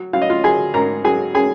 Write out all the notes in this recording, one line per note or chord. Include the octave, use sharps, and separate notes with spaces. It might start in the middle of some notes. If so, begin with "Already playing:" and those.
Already playing: F#3
F#3 F5
D#5
F4 F5
F#3 G#4 G#5
G#2 A#4 A#5
F#3 G#4 G#5
G#4 G#5